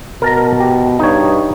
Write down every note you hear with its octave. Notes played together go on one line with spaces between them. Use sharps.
B2 A#4 A5 A#5
G4
G2 D#4 C#5